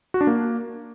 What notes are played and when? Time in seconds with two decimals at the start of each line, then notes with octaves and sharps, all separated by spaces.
0.14 F#4
0.21 D4
0.27 A#3